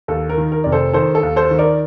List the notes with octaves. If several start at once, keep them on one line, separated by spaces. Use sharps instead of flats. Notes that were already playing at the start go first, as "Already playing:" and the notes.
D#2 A4
A#4
D#3
A#4
F1 D5
A4 C5
D#3 A4 C5
A4
D#2
A4 C5
D#3
A#4 D5